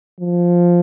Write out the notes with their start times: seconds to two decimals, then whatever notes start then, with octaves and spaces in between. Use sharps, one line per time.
0.20 F3